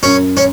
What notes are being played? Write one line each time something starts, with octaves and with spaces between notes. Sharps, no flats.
F#2 C#4
C#4